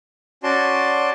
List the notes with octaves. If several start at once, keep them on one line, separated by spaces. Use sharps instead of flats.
C#4 F#4 D5 A5 C6